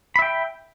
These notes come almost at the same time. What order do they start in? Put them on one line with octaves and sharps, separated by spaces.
B5 E5 G5